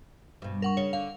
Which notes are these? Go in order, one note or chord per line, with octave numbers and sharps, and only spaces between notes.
G2 B2
A#4 F#5 C#6
C#3 C#5
D3 F5